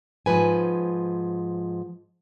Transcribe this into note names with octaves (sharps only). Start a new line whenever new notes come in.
G#2 F3 B4 G#5